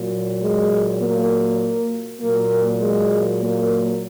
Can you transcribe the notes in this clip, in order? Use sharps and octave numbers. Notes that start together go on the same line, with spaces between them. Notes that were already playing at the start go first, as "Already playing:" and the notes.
Already playing: A#2 F#3
G#3
A#3
A#2 F#3 A#3
G#3
A#3